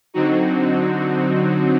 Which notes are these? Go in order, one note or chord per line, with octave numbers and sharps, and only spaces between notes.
D3 F#3 C4 D#4 F#4